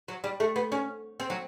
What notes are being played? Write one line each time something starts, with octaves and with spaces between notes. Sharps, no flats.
F#3
G3
A3
B3
C#4
C4
F#3